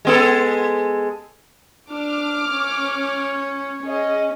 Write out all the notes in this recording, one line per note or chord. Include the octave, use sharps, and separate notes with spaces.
G#3 B3 A4
D4 D6 F6
C#4 C#5
C#4 G#4 D#5